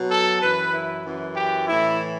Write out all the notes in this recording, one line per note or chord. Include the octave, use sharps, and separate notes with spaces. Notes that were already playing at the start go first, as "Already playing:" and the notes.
Already playing: B2 F#3
A4
F#2 E3 B4
E4
F#2 E3
G4
A2 E3 E4